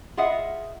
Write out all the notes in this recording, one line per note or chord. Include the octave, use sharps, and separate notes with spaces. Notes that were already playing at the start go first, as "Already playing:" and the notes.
F4 G#4 D#5 E5 F#5